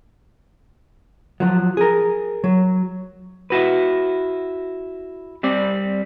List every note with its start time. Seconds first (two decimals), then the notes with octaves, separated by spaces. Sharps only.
1.40 F3 F#3
1.77 G#4 A#4
2.44 F#3
3.50 E4 F#4 B4
5.43 G3 C4 D5